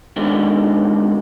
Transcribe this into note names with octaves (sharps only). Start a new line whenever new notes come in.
G#2 B2 D3 D#3 G#3